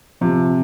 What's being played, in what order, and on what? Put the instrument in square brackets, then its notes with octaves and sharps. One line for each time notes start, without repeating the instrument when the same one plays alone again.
[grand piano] C3 [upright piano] F3